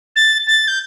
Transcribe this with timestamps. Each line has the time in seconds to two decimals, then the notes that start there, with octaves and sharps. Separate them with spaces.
0.16 A6
0.47 A6
0.68 G6